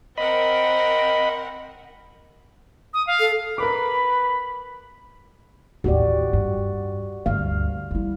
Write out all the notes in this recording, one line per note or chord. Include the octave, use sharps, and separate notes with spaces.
C4 A#4 D#5 F#5 B5
D#6
F5
A4
A#4 B4 B5 D6
A1 D#2 F#4 G4 D5
G2
D2 G2 F5
G3 E4